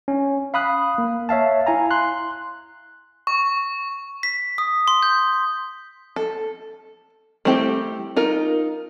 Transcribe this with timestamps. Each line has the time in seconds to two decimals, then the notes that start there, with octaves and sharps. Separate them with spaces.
0.08 C#4
0.54 F5 B5 D#6 F#6
0.98 A#3
1.29 C#5 E5 F5 A5
1.67 E4 F5 G#5 A#5
1.91 C6 F#6
3.27 C#6
4.23 B6
4.58 D#6
4.88 C6
5.03 G6
6.16 A4
7.45 G3 A3 C4 E4 G4
8.16 D#4 F4 A#4